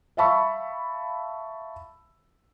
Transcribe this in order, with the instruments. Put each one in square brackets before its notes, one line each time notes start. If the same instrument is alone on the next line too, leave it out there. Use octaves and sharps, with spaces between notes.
[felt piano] E5 F5 A5 B5 C#6 E6